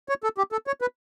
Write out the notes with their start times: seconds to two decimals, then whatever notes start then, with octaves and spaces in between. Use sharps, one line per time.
0.09 C#5
0.24 A4
0.38 G4
0.52 A4
0.67 C#5
0.81 B4